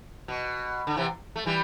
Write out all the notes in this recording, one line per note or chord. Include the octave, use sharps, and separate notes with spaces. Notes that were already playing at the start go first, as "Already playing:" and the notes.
B2
D3
C3 E3
A3
E3 G3